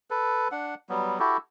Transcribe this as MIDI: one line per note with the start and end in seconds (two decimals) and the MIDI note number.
0.10 0.48 69
0.10 0.48 71
0.52 0.75 62
0.52 0.75 78
0.89 1.19 54
0.89 1.19 55
0.89 1.19 59
1.19 1.37 64
1.19 1.37 66
1.19 1.37 67
1.19 1.37 69